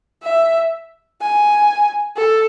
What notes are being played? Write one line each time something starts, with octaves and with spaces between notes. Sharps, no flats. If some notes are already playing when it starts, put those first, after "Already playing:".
E5
G#5
A4